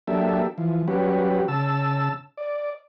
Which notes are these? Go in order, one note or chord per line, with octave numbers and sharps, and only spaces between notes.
F#3 A#3 D4 G4 A4 E5
E3 F3
F#3 G3 C#4 F#4 G4 B4
C#3 A5 E6
D5